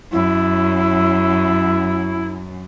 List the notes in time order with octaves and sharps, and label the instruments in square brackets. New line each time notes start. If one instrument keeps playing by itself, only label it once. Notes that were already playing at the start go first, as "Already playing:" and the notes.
[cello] F#2 [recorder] E4